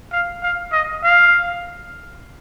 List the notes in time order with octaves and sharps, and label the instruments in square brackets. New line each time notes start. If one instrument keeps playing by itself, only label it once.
[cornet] F5
F5
D#5
F5